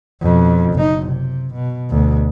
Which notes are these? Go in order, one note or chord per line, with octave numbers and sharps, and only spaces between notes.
F2 B2
F#1 D#4
C3
B2
D2 B2